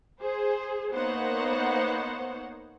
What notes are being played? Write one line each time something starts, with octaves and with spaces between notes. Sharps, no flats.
G#4 C5
A#3 B3 D#4 C5 C#5 F#5